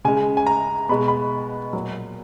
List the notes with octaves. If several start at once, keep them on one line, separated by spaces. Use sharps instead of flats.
C#3 G#3 G#5
G#5
A#5
B2 G#3 B5
B5
A#2 F#3